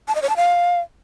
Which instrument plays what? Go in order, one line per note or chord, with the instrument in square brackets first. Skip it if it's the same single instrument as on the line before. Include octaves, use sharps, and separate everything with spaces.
[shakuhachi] A5
D#5
C#5
A5
F5